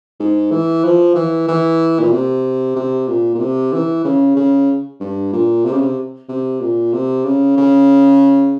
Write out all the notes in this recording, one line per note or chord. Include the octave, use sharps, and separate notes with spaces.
G#2
E3
F3
E3
E3
A#2
C3
C3
A#2
A#2
C3
E3
C#3
C#3
G2
A#2
C3
C#3
C3
C3
A#2
C3
C#3
C#3